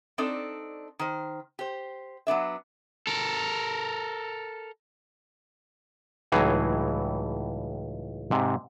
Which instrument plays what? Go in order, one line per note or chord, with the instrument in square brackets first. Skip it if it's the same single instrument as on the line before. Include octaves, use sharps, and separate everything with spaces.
[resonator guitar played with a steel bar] C4 D4 D#4 A4 D5
D#3 C5
G4 C5
F#3 B3 D4 E5
[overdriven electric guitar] A4 A#4
[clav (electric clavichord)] C#2 A2 E3 F#3 D#4 G#4
G#2 C3